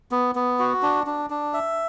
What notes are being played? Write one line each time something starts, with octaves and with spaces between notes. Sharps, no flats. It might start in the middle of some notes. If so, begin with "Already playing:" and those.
B3
B3
F#4
D4
D4
D4
E5